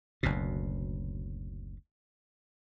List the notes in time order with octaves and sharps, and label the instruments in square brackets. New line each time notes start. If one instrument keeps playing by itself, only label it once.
[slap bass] F#1 D2 B2